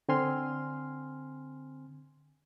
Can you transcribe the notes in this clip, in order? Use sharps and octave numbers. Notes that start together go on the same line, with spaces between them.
D3 C4 G#5 C6 F6